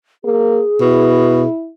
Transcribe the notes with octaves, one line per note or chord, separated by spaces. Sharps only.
A#3 G#4
B2 E4